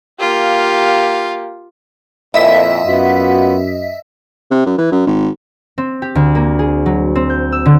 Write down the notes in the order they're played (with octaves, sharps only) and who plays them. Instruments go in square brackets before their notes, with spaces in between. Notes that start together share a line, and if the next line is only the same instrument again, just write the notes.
[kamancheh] A#3 G4 [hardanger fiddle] F4
[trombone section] F2 A#2 [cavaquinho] E4 [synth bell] D#5 E5 B6
[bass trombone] F#2 [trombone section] B3 F4 F#4
[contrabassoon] C3
F#2
E3
F#2
G#1
[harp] C4
G4
D2
A#3
G#4
F#3
C4
G6
E6
D3